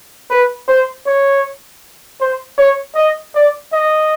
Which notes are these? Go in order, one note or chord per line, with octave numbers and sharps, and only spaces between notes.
B4
C5
C#5
C5
C#5
D#5
D5
D#5